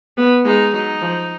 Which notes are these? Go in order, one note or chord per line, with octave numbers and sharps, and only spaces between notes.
B3
G#3 D#4
F#3 D#4
F3